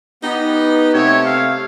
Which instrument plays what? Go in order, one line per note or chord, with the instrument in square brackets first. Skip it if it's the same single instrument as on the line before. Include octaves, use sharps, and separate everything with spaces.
[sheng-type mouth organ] B3 G4 B4 [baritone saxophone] D#4
[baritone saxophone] C3 [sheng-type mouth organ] A3 E6 [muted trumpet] C#5
[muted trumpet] F5